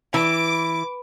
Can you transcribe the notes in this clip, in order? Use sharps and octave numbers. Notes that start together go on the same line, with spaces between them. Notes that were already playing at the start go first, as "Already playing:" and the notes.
E3 D6